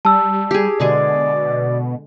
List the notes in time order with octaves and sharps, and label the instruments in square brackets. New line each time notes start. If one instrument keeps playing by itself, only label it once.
[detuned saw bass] G3 [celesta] A5 E6
[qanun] G4 G#4
[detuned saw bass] B2 [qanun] D3 G#3 G#4 [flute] D5